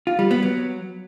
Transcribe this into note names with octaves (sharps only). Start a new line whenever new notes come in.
F4
G3
B3
F#3